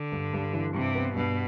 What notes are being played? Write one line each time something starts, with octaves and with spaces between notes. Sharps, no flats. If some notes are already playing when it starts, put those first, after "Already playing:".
Already playing: D3
G2
G2
E3
G2 C3
B3
G2 B2